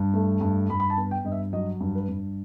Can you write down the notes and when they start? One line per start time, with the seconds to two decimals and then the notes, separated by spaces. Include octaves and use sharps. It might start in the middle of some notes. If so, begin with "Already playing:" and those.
Already playing: G2
0.14 A3
0.41 G2
0.69 G2 B5
0.80 B5
0.90 A5
0.97 B3
1.11 G5
1.25 G2 D#5
1.32 E5
1.53 F#3 D#5
1.81 G2
1.95 B4
2.09 G2